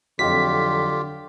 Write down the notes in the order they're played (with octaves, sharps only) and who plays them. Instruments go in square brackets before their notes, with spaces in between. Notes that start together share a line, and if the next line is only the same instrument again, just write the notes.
[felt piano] F2 F#3 [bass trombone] D3 [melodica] F4 G4 [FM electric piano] B6